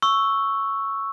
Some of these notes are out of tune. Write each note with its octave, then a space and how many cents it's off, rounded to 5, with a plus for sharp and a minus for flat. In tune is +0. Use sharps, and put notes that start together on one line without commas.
C#6 +0 E6 +0